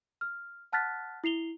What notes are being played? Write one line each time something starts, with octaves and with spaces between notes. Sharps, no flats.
F6
F#5 A5 F6 F#6 A6 B6
E4 C7 F7 G7